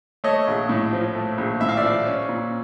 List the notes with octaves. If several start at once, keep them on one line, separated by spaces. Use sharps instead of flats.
A3 C#5 D#5
A#1
A2
F3
A3
A#1
A2 E5
F5
D5 E5
F3
C#4
A#2